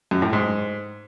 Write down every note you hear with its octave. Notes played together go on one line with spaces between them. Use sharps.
F#2
A2
G#2